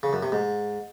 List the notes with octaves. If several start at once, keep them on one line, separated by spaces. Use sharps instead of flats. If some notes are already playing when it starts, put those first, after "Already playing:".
C#3
F#2
C3
G#2